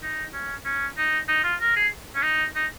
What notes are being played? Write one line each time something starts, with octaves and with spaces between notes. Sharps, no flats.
D#4
C#4
C#4
D#4
D#4
F4
A#4
G#4
C#4
D#4
D#4